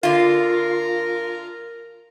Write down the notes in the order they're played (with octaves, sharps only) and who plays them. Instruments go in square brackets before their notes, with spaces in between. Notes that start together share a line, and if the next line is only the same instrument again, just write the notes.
[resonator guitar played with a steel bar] D3 F4 [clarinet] A#4